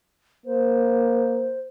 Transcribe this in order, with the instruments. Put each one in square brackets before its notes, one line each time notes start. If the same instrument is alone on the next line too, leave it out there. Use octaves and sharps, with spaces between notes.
[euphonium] A#3 [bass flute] C5